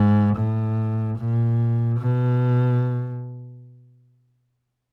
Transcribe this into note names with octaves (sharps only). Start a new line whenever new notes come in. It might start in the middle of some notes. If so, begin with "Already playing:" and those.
Already playing: G#2
A2
A#2
B2